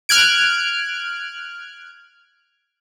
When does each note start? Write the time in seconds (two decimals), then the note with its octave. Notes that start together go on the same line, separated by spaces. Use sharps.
0.09 F6 F#6 G#6 D7